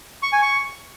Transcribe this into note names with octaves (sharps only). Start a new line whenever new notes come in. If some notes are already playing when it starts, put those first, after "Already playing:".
C#6
G#5
C#6